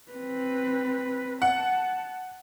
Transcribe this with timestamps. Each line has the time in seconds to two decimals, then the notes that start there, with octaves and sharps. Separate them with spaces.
0.12 C4 B4
1.42 F#5 A5